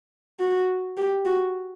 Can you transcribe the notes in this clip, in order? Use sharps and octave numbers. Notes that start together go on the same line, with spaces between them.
F#4
G4
F#4